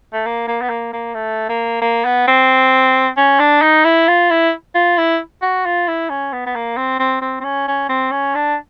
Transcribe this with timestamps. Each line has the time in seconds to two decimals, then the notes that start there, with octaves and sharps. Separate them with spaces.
0.13 A3
0.26 A#3
0.48 A#3
0.62 B3
0.69 A#3
0.93 A#3
1.15 A3
1.49 A#3
1.82 A#3
2.05 B3
2.28 C4
3.17 C#4
3.40 D4
3.62 D#4
3.85 E4
4.08 F4
4.30 E4
4.75 F4
4.98 E4
5.42 F#4
5.65 F4
5.88 E4
6.10 C#4
6.33 B3
6.46 B3
6.55 A#3
6.77 C4
6.99 C4
7.22 C4
7.40 C4
7.44 C#4
7.68 C#4
7.89 C4
8.12 C#4
8.35 D4